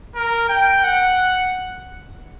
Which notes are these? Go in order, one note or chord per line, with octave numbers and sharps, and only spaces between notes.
A#4
G5
F#5